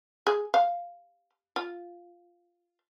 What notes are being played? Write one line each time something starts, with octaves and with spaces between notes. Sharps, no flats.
G#4
F5
F4